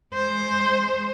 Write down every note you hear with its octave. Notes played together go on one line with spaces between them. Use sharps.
G#3 C5